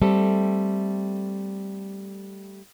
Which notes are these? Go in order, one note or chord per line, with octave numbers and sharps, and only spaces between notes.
G3 A3 C4 A4